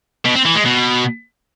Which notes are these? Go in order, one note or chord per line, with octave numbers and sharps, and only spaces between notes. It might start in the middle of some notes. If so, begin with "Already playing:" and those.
B2
C4
E3
G#3
B2